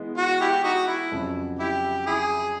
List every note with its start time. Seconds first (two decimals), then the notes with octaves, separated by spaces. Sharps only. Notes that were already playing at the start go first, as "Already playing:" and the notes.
Already playing: E3 G#3 B3
0.17 F#4
0.41 E4 G4
0.64 D#4 F#4
0.87 E4
1.12 F2 C#3 F#3
1.59 E4 G4
2.06 E4 G#4